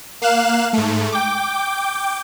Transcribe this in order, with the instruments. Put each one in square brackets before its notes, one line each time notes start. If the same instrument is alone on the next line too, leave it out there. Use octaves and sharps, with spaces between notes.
[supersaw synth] A#3 F5 F#6 E7
G#2 A3
G5 D6